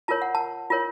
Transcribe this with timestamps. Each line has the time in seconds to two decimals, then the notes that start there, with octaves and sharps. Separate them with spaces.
0.08 F4 A#4 C#5 A5
0.22 F#5
0.35 A5
0.70 F4 A#4 C#5